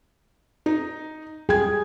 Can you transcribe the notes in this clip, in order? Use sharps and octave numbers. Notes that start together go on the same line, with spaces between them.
D#4
G3 G#4 G5 G#6